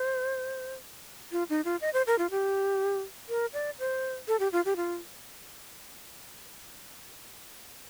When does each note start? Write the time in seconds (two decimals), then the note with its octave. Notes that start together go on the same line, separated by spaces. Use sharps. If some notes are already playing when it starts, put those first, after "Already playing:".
Already playing: C5
1.32 F4
1.50 D#4
1.65 F4
1.81 D#5
1.94 C5
2.07 A#4
2.19 F4
2.31 G4
3.29 A#4
3.53 D5
3.79 C5
4.28 A4
4.40 G4
4.52 F4
4.65 G4
4.76 F4